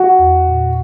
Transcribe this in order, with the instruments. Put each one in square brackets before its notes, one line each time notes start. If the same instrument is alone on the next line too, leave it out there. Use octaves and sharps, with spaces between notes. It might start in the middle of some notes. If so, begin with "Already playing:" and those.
Already playing: [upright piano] F#4
[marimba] E2
A#2